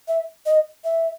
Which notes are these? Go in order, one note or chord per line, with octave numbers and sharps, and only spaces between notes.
E5
D#5
E5